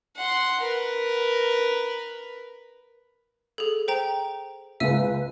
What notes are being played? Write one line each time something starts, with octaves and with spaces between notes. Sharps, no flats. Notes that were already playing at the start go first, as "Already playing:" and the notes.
F#5 C6
A#4 B4
G#4 A4
C5 G5 A#5
C#2 G#3 B4 E5 E6 D#7